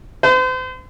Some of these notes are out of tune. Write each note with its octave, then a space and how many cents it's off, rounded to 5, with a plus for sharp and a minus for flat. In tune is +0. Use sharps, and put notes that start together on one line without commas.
C5 -40